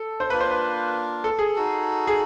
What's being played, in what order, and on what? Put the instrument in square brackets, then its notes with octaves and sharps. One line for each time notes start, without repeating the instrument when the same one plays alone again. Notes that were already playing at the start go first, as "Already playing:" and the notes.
Already playing: [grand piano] A4
C5
[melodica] A#3 D4 F4 [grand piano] B4
[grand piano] C5
B4
A4
G#4
[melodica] D#4 F#4 A4
[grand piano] G#4